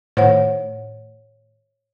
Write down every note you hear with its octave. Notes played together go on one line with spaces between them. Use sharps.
A2 D#3 C5 C#5 F#5